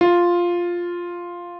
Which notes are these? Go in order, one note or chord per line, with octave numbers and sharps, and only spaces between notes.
F4